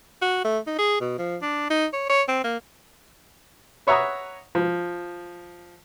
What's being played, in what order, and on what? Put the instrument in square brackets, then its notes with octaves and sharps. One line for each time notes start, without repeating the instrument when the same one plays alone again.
[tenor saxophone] F#4
A3
D#4
G#4
B2
F3
D4
D#4
C#5
C#5
C4
A#3
[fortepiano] B4 C#5 E5 F#5 A#5 D#6
F3